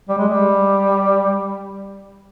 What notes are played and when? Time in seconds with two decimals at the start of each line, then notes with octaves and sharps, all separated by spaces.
0.09 G3
0.18 G#3
0.28 G3